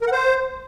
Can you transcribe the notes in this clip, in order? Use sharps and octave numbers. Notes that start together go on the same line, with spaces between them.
A#4
F#5
C5